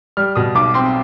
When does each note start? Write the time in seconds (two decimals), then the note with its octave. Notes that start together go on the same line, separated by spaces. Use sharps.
0.17 G3 F6
0.36 B2 D#6
0.55 B1 D6
0.74 C4 C6